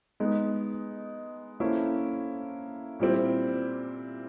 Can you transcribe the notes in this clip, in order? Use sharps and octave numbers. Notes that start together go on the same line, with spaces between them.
G#3 B3 D#4
A#3 C#4 E4 A4 C5
A#2 G3 C4 E4